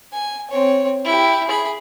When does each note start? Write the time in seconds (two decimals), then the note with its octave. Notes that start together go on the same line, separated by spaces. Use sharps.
0.13 G#5
0.51 C4 C#5
1.06 E4 G4
1.48 G#4 B5